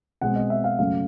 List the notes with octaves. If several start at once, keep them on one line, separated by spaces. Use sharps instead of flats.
B2 G#3 C4 F#5
D#5
E5
F5
F#2 C#3 F#3 A3 F5